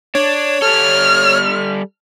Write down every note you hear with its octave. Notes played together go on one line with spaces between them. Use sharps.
D4 C#5
G3 A4 F6